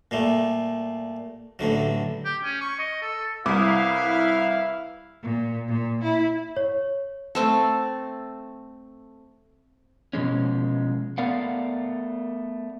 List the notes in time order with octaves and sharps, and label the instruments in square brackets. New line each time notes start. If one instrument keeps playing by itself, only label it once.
[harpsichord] A#2 G3 A3
A1 A2 D3 F#3
[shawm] G4
C#4
C#6
D#5
A4
[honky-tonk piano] C2 [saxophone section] E4 [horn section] B4 F5 [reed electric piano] D6 D#6
[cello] A#2
A#2
E4
[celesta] C#5
[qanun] A3 C4 A4
[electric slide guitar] B2 F3 G#3 C#4
A3 B3 A#4 D5 F5 F#5